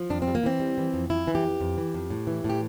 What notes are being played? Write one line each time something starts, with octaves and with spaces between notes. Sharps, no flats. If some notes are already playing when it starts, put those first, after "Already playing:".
Already playing: F3
F2 D4
C4
G3
A#3
E3 C4
G3
E3
F2
F2 E4
E3
G4
F2
F2
E3
F2
A2
E3
A2
G4